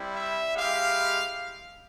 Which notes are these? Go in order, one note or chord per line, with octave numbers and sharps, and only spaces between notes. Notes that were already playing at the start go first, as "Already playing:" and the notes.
Already playing: G3 C4 E4
E5
G#3 E4 G4 F5